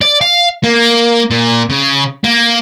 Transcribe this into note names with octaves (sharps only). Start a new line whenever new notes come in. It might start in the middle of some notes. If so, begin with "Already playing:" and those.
D5
F5
A#3
A#2
C#3
A#3